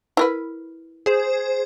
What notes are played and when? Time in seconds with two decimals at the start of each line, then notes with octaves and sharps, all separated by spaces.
0.17 E4 A#4 B4
1.06 G#4 C5